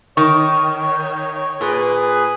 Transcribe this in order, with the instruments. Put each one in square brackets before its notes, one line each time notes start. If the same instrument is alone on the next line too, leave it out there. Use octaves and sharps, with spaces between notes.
[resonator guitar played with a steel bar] D#3 [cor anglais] C#5 [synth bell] C#6
[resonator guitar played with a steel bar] A#2 [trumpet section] G#4 B4